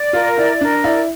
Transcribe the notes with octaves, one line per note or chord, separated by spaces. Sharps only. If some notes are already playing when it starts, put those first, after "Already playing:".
Already playing: D5
F4 A#4
E4 D5
D4 A#4
E4 D5